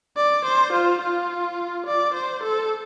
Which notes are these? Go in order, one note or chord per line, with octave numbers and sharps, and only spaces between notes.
D5
C5
F4
F4
D5
C5
A4